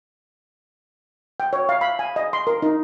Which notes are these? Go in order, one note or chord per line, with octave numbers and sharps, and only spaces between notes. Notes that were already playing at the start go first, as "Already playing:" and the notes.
G5
C#5
F5
B5
G#5
D#5
C6
A#4
D#4